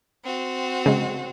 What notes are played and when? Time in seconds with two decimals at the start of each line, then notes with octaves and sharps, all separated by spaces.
0.24 C4 F#4
0.86 C#3 G#3